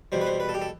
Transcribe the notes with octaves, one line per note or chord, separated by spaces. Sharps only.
E2 B2 G3 C5
B4
C5
B4
A4
G4
A4